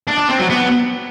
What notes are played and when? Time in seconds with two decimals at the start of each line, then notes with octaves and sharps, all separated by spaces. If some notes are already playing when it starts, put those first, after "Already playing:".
0.07 D4
0.18 D4
0.28 C4
0.39 F#3
0.49 B3